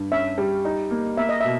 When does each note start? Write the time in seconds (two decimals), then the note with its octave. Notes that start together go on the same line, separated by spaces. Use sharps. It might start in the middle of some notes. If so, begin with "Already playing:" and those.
Already playing: G2
0.12 C#4 E5
0.38 G3
0.65 D#4
0.91 A#3
1.17 A#3 E5
1.29 D#5
1.40 B2 E5